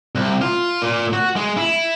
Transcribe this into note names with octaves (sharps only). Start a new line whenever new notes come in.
C2
F4
A#2
F#4
G#3
E4